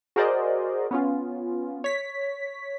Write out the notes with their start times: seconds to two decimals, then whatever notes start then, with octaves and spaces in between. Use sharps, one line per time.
0.16 F#4 G#4 A#4 C5 D5 D#5
0.91 B3 C#4 F4
1.84 C#5 B6